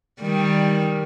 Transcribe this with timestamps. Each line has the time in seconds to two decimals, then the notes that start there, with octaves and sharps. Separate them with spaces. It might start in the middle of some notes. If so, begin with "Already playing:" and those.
0.21 D#3 G3